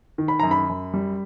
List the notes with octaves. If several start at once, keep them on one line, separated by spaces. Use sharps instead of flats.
D#3
B5
F#2 A#5
B5
F#2
G3